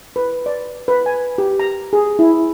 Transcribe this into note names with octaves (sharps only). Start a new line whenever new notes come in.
B4
D5
B4
G#5
G4
A#5
G#4
E4